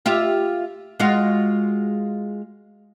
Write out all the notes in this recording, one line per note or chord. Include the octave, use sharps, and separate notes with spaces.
F4 G4 E5
G#3 F4 F#4